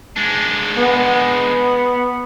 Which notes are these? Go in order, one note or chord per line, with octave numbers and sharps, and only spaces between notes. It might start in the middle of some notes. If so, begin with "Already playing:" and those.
G#3 D4
B3